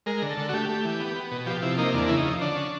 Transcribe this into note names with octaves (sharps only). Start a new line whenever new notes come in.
G#3 A#4
D3
A4
D3
F#4
A3 G4
A3
E3
B3
B3
B2
F3 G4
C3 E4
A#3 D#4
E2 D4
C#3 E4
D#4
F3
D3 D4
C#4